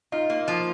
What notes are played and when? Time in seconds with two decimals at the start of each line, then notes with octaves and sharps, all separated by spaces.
0.12 D#4 F4
0.30 A#3
0.48 F3